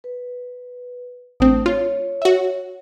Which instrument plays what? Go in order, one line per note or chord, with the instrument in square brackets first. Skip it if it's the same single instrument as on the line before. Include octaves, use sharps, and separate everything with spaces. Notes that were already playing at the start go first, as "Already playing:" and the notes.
[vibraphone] B4
[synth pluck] A1 C4 [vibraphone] A3 D4 D#6
[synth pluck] F4 [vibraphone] C#5
[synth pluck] F#4 E5